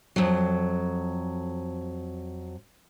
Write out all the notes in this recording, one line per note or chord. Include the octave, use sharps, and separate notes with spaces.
F2 F#3